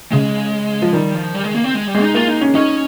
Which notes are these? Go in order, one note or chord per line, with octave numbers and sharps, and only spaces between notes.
C#3 G#3
F3
D#3 G3
F3
G3
G#3
A#3
C4
G#3
G3
G#3
D#4
A#3 F4
D#4
C#4
C#4 D#4